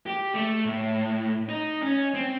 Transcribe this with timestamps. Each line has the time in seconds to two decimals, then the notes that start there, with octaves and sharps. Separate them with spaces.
0.06 G4
0.34 A3
0.65 A2
1.49 D#4
1.82 C#4
2.14 C4